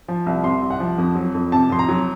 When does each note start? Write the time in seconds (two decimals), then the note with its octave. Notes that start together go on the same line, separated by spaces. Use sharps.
0.08 F3
0.27 C2
0.43 C3 C6
0.62 C2
0.70 F#5
0.80 F3
0.98 F2
1.16 F#3
1.35 F2
1.52 C3 A5
1.70 F2 C6
1.79 A#5
1.89 F#3